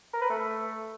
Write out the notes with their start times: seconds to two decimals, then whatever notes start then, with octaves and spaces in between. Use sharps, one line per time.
0.13 A#4
0.22 B4
0.30 A3